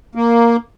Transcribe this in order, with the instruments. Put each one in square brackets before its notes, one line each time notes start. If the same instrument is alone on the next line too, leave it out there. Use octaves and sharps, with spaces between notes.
[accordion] A#3